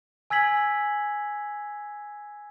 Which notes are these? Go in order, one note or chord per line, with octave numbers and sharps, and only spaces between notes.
G#5 E6 G#6 B6 F#7